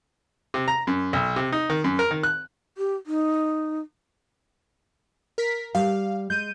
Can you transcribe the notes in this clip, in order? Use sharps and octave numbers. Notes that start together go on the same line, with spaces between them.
C3
A#5
F#2
B1
C3
D#4
D#3
F#2
A#4
D#3
F#6
G4
D#4
A#4 B6
G3 F5
G#3 G6 D#7